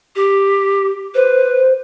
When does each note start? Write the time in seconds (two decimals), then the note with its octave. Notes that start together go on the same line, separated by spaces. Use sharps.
0.16 G4
1.15 B4 C5